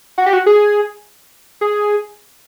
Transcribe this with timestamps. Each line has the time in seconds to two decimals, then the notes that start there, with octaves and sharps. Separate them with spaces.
0.18 F#4
0.26 G4
0.33 F#4
0.46 G#4
1.61 G#4